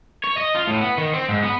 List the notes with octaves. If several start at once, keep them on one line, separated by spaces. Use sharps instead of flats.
C#5
D#5
F4
A2
B3
D#3
C4
G#2
B3